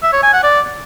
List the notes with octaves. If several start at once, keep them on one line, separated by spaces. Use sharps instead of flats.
E5
C#5
G#5
F#5
D5